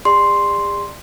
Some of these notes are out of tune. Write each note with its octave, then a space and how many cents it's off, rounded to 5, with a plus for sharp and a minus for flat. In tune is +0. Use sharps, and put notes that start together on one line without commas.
G#4 -45 D5 +15 C6 +0